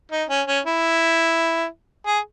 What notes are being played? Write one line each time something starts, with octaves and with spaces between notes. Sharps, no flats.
D#4
C#4
C#4
E4
G#4